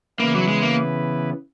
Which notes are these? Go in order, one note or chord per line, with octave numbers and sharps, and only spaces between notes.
C#3 E3 A#3 B3 E4 B4
F#3
G#3
A#3